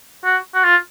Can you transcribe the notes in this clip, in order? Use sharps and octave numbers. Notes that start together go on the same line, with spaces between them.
F#4
F#4
F4